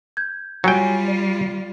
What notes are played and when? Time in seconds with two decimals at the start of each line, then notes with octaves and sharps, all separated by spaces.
0.17 G6 G#6
0.64 F#3 G3 F4 C#5 G5 G#5 C#7
1.08 D5